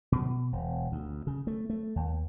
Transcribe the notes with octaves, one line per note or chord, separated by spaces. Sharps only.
B2
E1
D2
C#3
A3
A3
D#2